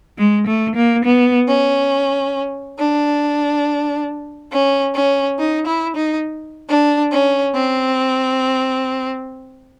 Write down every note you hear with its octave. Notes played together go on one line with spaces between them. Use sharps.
G#3
A3
A#3
B3
C#4
D4
C#4
C#4
D#4
E4
D#4
D4
C#4
C4